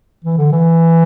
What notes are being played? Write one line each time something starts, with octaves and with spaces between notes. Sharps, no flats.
E3
D3
E3